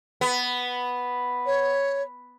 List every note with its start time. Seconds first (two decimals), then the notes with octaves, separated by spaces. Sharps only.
0.21 B3
1.46 C#5